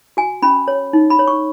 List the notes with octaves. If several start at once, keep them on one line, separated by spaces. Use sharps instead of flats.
F#4 G#5
C#4 B5
C#5
D#4
B5
C#5
C#6